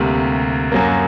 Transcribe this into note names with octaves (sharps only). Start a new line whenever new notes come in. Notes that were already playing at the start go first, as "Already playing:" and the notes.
Already playing: D2 C3 G3 A#3
F#2 F#3 A#3